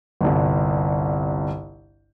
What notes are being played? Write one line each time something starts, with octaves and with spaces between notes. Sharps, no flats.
G1 C2